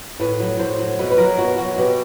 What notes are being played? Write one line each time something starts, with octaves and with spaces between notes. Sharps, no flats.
A2 B4
F#3
A2 C5
F#3
B2 B4
B4
F#3 A#4
B2 F#4
F#3 F#4
B2 G4